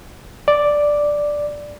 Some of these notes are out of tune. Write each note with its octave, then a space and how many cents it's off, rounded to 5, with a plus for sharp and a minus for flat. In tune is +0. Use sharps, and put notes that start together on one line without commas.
D5 +0